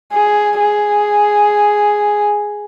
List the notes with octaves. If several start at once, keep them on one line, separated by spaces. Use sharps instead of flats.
G#4
G#4